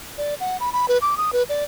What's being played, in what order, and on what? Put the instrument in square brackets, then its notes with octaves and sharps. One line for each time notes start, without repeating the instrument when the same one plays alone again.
[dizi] D5
F#5
B5
B5
B4
D6
D#6
B4
D5